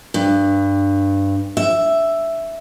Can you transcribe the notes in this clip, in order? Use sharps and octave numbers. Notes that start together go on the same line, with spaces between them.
G2
E5